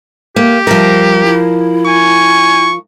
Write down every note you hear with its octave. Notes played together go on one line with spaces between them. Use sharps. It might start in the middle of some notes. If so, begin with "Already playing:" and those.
A#3 G4
F3 G3 A#4
E4
G#5 C#6